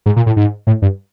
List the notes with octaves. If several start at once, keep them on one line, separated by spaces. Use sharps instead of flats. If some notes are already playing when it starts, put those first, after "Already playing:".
G#2
A#2
A2
G#2
A2
G2